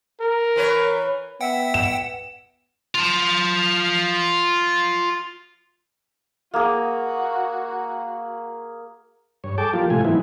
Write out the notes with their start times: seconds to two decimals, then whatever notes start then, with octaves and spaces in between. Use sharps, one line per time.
0.21 A#4
0.56 E3 B4 C#5
1.41 B3 E5 F#5 G5
1.74 E7
2.95 F4 A5
6.54 A#3 F#4 G#4
9.44 G2 C#5
9.58 G#4 A4 G5 A5 D6
9.73 F3 G3 A#3 F4 G4
9.90 A2 C3 A3 F4 G#5
10.05 E3 F#3 B3 C4 D#4 E4